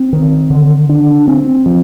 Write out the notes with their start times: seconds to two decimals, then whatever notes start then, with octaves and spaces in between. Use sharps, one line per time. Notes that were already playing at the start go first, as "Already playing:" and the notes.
Already playing: C4
0.13 D#3
0.50 D3
0.89 D4
1.28 C4
1.66 F3